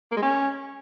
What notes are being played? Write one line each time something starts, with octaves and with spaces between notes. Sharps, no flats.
A#3
G#3
C#4